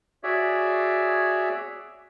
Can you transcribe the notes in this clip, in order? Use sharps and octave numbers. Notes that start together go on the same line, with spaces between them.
F#4 G#4 C#5 D5 E5